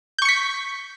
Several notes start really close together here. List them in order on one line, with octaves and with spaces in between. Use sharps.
G6 C#6 C#7 B6